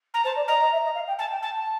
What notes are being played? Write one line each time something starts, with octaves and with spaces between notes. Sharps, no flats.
A#5
C5 A5
D5
D#5 A#5
D#5
E5
D#5
F5
G5
G#5 A5
G5
G#5 A5
A5